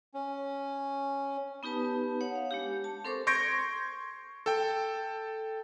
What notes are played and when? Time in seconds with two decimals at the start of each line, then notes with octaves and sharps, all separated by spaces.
0.14 C#4
1.63 B3 D#4 G4 B4 A5
2.21 C#5 F#5
2.35 F5
2.51 G#3 D4 G4
2.84 A5
3.05 C4 A4 A#4 C5 C#6 D6
3.27 C6 C#6 G6 G#6 A#6 D7
4.46 A4 G5